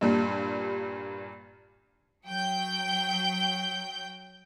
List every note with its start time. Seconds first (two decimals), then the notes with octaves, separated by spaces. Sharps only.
0.01 G2 A#2 G3
2.26 F#3 G5 G6